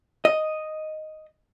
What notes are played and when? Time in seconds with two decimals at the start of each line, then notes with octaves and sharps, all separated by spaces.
0.25 D#5